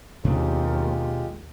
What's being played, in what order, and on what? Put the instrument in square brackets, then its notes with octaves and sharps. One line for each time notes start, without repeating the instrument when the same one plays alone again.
[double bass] D#2 [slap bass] B2 C4 D4 [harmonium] G#3 F4 G4